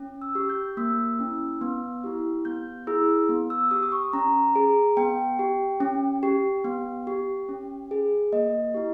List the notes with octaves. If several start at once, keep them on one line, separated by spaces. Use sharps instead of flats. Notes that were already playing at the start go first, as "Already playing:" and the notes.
Already playing: C#4
E6
G4
G6
A#3 E6
C#4 E4
B3
E4 G4
B3 G6
E4 G#4 E6
B3
E6
G4 D#6
D#6
C#6
C#4 A#5
G#4
B3 G5
G4
C#4
G4
B3
G4
C#4
G#4
A#3 D#5
E4 G4